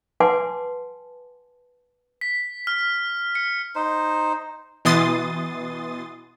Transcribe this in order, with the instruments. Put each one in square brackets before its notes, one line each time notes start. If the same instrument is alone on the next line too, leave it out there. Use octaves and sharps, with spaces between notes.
[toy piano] B4 F#5 G#5 A5 C6 D6
[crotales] B6
F6
C#7
[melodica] D#4 C5
[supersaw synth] B2 E3 C6 D#6 A6